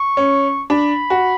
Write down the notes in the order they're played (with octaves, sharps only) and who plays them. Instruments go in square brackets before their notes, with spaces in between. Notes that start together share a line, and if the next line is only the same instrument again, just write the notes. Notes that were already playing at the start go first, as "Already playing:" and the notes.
Already playing: [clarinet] C#6
[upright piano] C#4
[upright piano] D4 [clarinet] B5
[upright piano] F#4